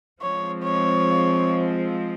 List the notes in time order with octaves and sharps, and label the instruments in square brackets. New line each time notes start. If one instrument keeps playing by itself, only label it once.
[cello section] F3 G#3 C4 [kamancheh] C#5
[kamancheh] C#5